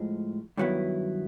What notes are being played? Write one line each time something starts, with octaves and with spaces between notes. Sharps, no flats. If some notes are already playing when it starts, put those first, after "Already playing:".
Already playing: A2 F3 G#3
G2 D#3 F#3 B3 E4